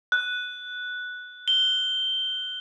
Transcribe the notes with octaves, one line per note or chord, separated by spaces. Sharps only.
F#6
G7